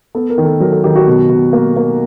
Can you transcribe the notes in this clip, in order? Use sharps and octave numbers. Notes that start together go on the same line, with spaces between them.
B3 A4
A#4
D#3
A4
F#3 A#4
A4
D#3 G4
F#4
B2
B2
A#3
A#3